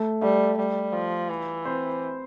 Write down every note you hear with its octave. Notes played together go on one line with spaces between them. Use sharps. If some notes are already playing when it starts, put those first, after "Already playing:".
Already playing: A3 A4
G3 A3 A4
G3
F3
E3
C4 C5